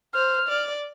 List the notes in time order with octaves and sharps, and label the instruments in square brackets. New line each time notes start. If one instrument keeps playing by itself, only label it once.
[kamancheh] C5 [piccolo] F6
[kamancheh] D5